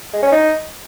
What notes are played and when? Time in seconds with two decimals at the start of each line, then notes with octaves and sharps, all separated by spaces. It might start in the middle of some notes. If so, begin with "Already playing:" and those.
0.13 G#3
0.23 C#4
0.32 D#4